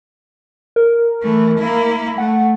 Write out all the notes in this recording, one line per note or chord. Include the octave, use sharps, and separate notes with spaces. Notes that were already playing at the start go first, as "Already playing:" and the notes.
A#4
E3 A3
A#3 E4
A3 F#5